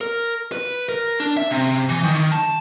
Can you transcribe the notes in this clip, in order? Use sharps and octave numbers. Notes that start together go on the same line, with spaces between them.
A#4
B4
A#4
D4
E5
C3
E3
D#3
A5